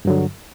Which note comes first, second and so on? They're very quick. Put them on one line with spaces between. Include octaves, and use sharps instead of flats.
G2 F#3 D3